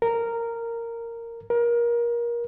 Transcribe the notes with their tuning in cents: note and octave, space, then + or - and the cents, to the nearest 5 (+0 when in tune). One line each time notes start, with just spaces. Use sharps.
A#4 -10
A#4 +25